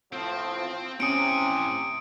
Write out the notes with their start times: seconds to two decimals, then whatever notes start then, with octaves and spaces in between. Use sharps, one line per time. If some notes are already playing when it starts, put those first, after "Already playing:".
0.13 A2 E3 F3 C4 C5
1.00 A2 C3 C4 C#4 G#5 D#6 C#7 D7